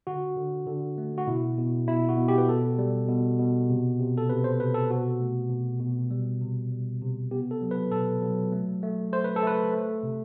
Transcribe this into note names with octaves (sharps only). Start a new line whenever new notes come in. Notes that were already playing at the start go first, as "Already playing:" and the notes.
D3 F#4
D3
D3
A3
F#4
B2 E4
B2
B2 E4
F#4
B2
G4
B4
B2 A4
G3
B2
B2
C3
C3
A4
C3 B4
C5
C3 B4
A4
B2 F#4
A3
B2
B2
G3
C3
G3
C3
B3 G4
A4
F#3
B4
B2 A4
F#3
A3
A3
A3 C5
B4
A4
A3 B4
A3
C3